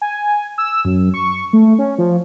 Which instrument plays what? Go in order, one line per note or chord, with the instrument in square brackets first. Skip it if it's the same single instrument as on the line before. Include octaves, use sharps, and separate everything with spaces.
[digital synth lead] G#5
E6
F#2
C#6
A3
C#4
F3